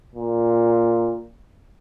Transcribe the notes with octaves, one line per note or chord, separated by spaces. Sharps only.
A#2